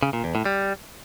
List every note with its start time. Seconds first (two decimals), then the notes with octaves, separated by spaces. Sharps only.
0.03 C#3
0.13 A#2
0.24 E2
0.35 A2
0.46 G3